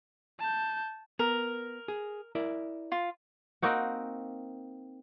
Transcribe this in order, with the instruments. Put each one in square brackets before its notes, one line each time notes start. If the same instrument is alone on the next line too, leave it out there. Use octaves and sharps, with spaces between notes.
[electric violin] A5 G6
[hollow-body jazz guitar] B3 [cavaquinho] A#4
[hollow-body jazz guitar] G#4
E4 A#4 D5
[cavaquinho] F4
[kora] A#3 C4 D#4 F#4